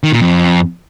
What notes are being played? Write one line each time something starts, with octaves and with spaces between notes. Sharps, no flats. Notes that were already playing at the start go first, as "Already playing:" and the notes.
D#3
A#2
F2